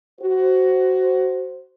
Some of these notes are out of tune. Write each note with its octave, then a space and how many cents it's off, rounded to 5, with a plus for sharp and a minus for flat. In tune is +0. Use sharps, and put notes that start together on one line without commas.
F#4 +15 C5 +0